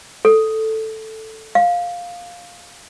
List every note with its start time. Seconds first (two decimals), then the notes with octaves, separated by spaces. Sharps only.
0.25 A4
1.55 F5